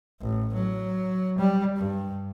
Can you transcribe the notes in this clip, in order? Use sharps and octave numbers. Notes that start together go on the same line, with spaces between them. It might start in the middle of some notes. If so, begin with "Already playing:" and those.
A1
F#3
G3
G2